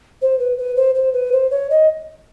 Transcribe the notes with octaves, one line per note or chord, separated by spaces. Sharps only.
C5
B4
B4
C5
C5
B4
C5
C#5
D#5